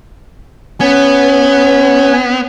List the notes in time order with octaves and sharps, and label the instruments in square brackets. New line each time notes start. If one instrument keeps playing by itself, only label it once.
[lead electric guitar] B3 [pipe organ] C#4 C#5